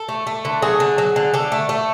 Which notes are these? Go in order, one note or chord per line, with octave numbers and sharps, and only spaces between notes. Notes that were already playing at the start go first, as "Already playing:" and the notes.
Already playing: A4
A3
A3
D3
F#3 G#4
D3
F#3
D3
D3 A4
A3
A3